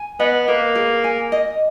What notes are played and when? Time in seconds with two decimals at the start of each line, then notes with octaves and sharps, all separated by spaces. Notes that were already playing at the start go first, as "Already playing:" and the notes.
Already playing: G#5
0.20 B3 D#5
0.48 A#3 B4
0.75 G#4
1.04 G#5
1.32 D#5